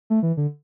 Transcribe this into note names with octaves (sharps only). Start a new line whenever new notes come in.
A3
E3
D3